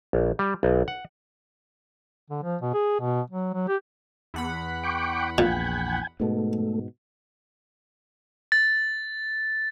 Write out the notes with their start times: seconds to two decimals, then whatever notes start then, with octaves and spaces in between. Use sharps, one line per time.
0.13 A#1
0.39 G3
0.63 B1
0.88 F#5
2.30 D3
2.43 F3
2.61 B2
2.74 G#4
3.00 B2
3.30 F#3
3.54 F#3
3.68 G4
4.34 E2 F#5 B5
4.83 G5 C#6 D6
5.38 A#1 A#2 G5 G#5
6.20 G#2 B2 A3
8.52 A6